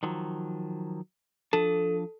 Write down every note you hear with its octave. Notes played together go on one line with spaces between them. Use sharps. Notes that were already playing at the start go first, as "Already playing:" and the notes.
D#3 F3 F#3
F3 D4 A4 A5